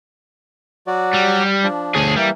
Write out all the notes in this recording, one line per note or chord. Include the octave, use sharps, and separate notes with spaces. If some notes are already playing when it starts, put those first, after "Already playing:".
F#3 F#4 D5
G3
F3 D4
D2 G#4 C#5 A5
E3 G3 A#3